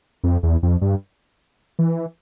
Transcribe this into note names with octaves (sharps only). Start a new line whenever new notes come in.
F2
E2
F2
G2
E3